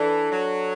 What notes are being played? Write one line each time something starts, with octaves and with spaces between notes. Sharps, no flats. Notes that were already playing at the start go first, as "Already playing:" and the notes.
Already playing: E3 D4 A4 D5
F#3